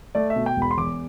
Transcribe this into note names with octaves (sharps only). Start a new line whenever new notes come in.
A3 D5
E5
B2
G5
E1
B5
C6
E2 D6